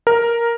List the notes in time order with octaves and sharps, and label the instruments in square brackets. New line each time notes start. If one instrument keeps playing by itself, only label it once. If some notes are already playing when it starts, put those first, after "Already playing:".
[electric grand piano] A#4